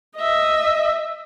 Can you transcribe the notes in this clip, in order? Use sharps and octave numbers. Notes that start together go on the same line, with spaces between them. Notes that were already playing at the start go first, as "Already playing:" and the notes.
D#5 E5